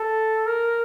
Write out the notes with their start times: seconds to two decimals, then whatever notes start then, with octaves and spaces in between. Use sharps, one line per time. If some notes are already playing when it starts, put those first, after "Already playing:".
Already playing: A4
0.46 A#4